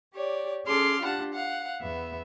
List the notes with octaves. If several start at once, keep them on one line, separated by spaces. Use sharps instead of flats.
G4 C#5 D5
C#4 G#4 A4 C6 D6 F6
D4 F4 G4 F#5 A5
F5 F#5
E2 B3 E5